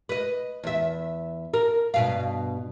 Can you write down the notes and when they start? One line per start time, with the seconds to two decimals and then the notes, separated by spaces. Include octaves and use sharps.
0.09 B4 D#5
0.64 E2 E5
1.54 A#4
1.94 G2 B2 F5